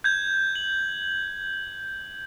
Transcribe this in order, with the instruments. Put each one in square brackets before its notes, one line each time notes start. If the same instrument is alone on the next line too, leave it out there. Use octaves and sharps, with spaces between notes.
[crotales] G6 G#6
F#7